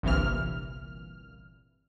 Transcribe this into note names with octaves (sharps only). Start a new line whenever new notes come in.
G1 C2 A#2 E3 F6